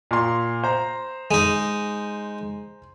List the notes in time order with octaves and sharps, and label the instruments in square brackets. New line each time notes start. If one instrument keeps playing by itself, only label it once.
[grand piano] A#2 A#5 C6
C5 A#5
[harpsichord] G#3 D#4